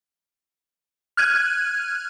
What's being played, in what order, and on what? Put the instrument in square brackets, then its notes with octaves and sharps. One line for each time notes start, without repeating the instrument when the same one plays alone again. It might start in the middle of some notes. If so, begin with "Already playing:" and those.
[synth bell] F6 F#6 G#6 D#7